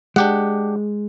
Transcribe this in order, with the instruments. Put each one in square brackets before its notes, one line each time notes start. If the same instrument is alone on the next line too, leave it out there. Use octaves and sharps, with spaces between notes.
[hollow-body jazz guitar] G#3 [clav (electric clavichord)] D4 G4 F#5